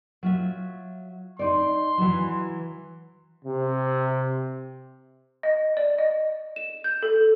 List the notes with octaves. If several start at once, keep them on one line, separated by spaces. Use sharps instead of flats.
F#3 F4 E5
D#4 D5 C6
E3 F#3
C3
D#5
D5
D#5
E7
G6
A4